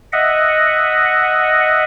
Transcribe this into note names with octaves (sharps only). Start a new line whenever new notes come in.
D#5 E5 F#5